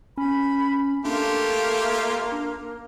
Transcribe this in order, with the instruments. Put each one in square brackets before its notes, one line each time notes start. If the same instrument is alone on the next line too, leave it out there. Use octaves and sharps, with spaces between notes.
[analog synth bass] C#4 [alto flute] B5
[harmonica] A3 F4 G4 [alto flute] A#3 [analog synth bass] D4